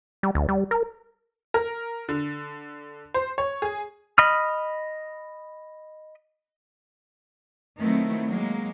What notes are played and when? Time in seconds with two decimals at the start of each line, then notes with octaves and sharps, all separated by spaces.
0.23 G3
0.35 D2
0.49 G3
0.71 A#4
1.54 A#4
2.09 D3
3.14 C5
3.38 C#5
3.62 G#4
4.18 D#5 B5 D#6 F6
7.80 D#3 F#3 A3 B3 C4 E4
8.27 F#3 G#3 A#3